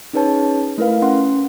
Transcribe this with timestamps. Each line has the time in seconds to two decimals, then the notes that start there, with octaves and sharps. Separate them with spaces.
0.13 C#4 D#4 G#4 B4 C#5 A5
0.78 A3 E4 A#4 B4 F5
1.02 C#4 F#5 C6